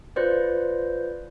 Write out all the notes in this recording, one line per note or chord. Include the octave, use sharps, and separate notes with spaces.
F4 B4 C5 D5